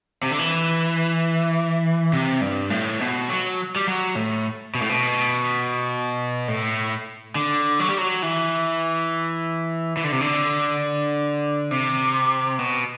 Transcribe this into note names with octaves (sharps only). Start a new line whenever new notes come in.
C3
D3
E3
C3
G2
A2
B2
F#3
G3
F#3
A2
B2
A2
B2
A2
D3
F#3
G3
F#3
E3
E3
D3
C3
D3
C3
B2